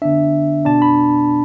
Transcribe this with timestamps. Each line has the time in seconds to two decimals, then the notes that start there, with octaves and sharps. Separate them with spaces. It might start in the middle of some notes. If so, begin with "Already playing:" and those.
0.02 D3 B3 D4 E5
0.65 B2 B3 D4 A5
0.82 B5